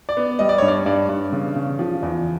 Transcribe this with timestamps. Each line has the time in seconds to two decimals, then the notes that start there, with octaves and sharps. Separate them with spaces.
0.09 D5
0.17 B3
0.39 G3 D#5
0.49 D5
0.58 G2 C#5
0.68 D5
0.86 G2 D5
1.09 G2
1.32 C#3
1.56 C#3
1.79 F3
2.03 E2